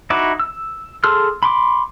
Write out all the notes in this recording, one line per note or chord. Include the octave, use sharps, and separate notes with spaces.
D#4 E4 F#4 D6
E6
G#4 A4 C6 E6 F6
B5 C6 D6